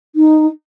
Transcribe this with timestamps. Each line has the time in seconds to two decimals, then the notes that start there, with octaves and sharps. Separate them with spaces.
0.15 D#4